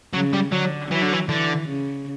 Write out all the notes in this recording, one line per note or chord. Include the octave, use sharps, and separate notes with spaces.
C#3 F#3
G3
D3 F#3
E3 F#3
D3
E3
D3 E3
C#3